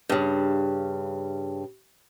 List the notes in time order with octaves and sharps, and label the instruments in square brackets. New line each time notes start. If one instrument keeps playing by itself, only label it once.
[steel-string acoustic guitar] G2 C#3